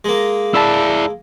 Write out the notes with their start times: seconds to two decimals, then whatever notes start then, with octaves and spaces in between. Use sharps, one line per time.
0.04 G#3 A#3
0.54 E4 D5 A5 B5 E6